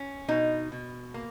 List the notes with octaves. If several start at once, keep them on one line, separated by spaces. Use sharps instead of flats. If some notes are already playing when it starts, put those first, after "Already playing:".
Already playing: C#4
B2 D#4
B2
A#3